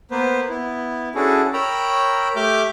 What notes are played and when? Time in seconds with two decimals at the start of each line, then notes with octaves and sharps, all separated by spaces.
0.11 A#3 B3 B4 C5
0.49 B3 E4
1.15 C#4 D4 E4 F#4 G#4 A4
1.53 A#4 C#5 G5 A#5 B5 E6
2.36 A3 G4 E5 D6 F6 G6